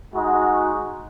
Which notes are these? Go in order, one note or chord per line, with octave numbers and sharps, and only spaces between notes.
G#3 D#4 F#4